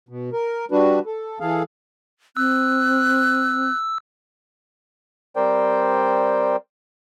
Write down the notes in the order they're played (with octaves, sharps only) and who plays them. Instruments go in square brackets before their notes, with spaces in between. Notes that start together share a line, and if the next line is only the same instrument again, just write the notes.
[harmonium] B2
A#4
G3 D4 F#4 B4
A4
E3 G#4 A4 F5
[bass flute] C4 [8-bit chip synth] E6 [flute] F#6
[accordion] G3 C4 A#4 C5 D5 G5